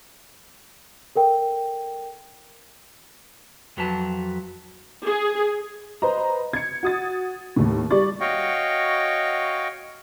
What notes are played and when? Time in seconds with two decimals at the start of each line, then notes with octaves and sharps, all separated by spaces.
1.16 A4 A#4 G5
3.77 F2 F#3 B4 A5
5.07 G#4
6.02 B4 C5 D#5 A#5
6.53 G#6 C#7
6.83 F#4 D#6 A6
7.56 D#2 A2
7.91 G3 D5 C#6 A6
8.21 F#4 C#5 D#5 F5 G5 C#6